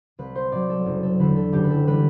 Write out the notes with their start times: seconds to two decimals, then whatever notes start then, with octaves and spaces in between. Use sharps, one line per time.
0.19 C2 B4
0.35 C5
0.52 C3 F#3 D5
0.70 A4
0.86 F#1
1.03 A4
1.19 E2 D3 B4
1.36 A4
1.52 F#1 G4
1.64 B4
1.70 A4
1.87 E3 G3 B4